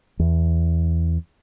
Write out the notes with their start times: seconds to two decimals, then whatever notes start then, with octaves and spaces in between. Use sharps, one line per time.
0.19 E2